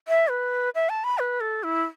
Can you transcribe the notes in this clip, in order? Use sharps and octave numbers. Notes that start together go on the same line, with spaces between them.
E5
B4
E5
A5
B5
B4
A4
E4